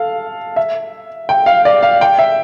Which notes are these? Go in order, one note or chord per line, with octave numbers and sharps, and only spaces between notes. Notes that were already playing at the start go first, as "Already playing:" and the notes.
Already playing: A4 F5
E5
G5
F5
D5
F5
G5
E5